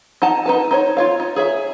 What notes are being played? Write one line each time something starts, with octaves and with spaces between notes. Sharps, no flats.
D#4 F#5 A5 A#5
D#4 B4 A5
D#4 C5 C#5
F4 C#5 F5
D#4
G#4 C#5 E5